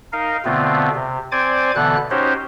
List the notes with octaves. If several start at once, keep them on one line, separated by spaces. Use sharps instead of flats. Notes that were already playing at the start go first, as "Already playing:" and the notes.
D#4 A#4 D#5 F5
B2 D3 A3 B3 C4 F4
C3
C4 C5 D5 G#5 D6 G#6
B2 D3 E3 B3 A4 F#6
C#4 D#4 F#4 G4 C5 C#5